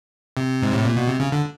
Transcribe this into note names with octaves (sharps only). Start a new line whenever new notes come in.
C3
G#2
A2
A#2
B2
C3
C#3
D3